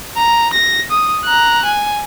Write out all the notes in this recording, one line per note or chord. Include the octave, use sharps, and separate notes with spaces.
A#5
A#6
D#6
A#5 F#6
G#5